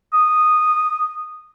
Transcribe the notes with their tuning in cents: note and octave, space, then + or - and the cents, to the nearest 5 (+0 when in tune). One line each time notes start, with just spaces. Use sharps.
D#6 -10